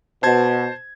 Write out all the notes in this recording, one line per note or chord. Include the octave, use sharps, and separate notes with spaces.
B2 C5 A5 G#6